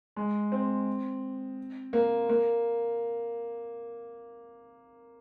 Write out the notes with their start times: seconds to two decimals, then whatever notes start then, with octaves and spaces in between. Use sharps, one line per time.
0.16 G#3
0.52 C4
1.93 A#3
2.29 A#3